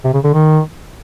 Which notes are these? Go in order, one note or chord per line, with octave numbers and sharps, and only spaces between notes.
C3
C#3
D3
D#3